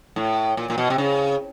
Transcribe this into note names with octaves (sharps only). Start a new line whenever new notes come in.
A2
A#2
A#2
B2
C3
C#3